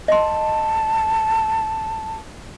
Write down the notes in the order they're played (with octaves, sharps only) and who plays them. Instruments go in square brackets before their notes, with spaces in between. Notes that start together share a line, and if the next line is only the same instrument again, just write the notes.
[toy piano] D#5 C6 [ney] A5